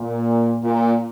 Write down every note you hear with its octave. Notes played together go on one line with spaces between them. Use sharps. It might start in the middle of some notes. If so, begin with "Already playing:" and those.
Already playing: A#2
A#2